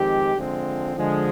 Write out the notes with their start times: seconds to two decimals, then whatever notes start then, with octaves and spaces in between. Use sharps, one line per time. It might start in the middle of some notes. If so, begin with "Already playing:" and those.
Already playing: F2 D#3 G#3 C4 G4
0.36 D3 F3 G#3 C4
0.95 D3 F3 G#3